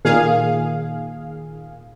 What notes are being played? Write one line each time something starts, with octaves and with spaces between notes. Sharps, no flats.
A#2 D#3 G#4 F5